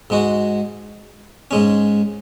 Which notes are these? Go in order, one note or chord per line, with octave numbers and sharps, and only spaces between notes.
G#2 G#3 F#4
G#2 G#3 C#4